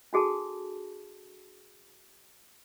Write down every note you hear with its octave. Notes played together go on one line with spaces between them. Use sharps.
D4 F#4 G#4 A4 A5